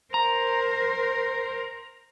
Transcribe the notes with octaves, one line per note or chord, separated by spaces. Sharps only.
A#4 C5 A#5